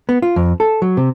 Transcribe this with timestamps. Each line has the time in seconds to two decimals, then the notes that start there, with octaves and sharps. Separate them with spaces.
0.09 B3
0.22 F4
0.36 F2
0.60 A4
0.82 F#3
0.97 C3